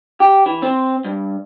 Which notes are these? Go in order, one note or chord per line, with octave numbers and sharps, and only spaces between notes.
G4
E3
C4
G2